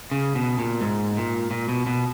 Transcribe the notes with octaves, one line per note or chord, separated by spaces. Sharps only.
C#3
B2
A#2
G#2
A#2
A#2
B2
B2